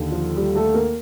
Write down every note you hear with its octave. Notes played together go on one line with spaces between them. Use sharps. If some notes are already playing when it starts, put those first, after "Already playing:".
Already playing: D#2 D3
F3 F4
G3 G4
A3 A4
A#3 A#4